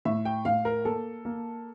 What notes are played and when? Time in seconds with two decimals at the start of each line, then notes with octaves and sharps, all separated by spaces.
0.05 A2 E5
0.25 G5
0.45 A2 F5
0.65 A#4
0.85 A#3 A4
1.25 A#3